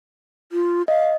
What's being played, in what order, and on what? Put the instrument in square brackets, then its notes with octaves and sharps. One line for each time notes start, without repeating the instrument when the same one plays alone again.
[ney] F4
[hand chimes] D#5 [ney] F5